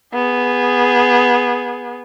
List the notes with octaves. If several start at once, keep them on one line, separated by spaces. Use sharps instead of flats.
B3 G#4